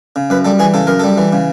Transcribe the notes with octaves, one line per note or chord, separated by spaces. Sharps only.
C#3
F#2 B4
G3 A4
E3 G#4
C#3 A4
F#2 A#4
G3 A4
E3
C#3